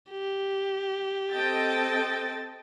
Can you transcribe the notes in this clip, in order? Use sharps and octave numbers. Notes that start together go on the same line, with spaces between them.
G4
C4 A4 D#5 G5 A5 A6